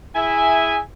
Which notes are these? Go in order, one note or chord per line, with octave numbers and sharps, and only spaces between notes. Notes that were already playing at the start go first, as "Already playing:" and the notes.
E4 G#4 E5 G#5